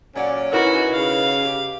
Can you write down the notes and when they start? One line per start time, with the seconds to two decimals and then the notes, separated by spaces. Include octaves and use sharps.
0.15 A#2 F#3 C#4 D5 F#5
0.53 B2 D#4 E4 F#4 A#4
0.93 C#3 F5
1.45 G4